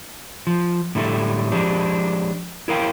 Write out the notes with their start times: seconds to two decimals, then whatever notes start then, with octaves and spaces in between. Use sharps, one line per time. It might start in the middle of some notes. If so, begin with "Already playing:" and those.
0.47 F3
0.95 A2 D3 G3 E4 A4 E5
1.52 F3 G#3 D4 G4
2.68 E4 A#4 F5 G5